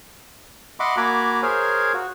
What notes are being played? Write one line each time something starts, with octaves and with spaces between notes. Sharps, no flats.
D#5 E5 F#5 B5 C6 D6
A#3 F#4 G#5 A#5 B5 D6
G#4 A#4 C5 C#5 F5 G#5
F#4